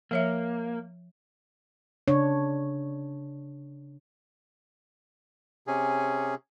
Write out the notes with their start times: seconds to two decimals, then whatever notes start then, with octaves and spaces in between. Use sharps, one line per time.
0.11 F3 A#3 C#5 E5
2.08 C#3 D4 C#5
5.67 C3 C#4 G#4